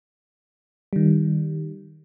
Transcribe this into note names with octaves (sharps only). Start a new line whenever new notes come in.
D#3 G3